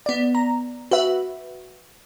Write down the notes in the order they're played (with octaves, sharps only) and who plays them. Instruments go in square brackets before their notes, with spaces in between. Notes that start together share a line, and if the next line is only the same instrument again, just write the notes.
[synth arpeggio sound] B3 D5
A#5
F#4 B4 E5